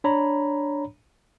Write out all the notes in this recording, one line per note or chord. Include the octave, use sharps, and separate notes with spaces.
D4 C#5 A#5 B5